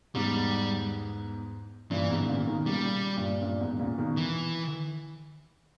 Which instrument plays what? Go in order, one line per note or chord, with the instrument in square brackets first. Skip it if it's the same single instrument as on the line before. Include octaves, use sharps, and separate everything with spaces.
[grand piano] E2 G#2 [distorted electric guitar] G3
[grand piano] G2 A#2 [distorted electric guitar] E3
[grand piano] G#2 B2
A#2 C#3
B2 D#3
[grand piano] A#2 C#3 [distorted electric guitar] G3
[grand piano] G2 A#2
G2 A#2
E2 G#2
A#2 C#3
B2 D#3
[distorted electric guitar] E3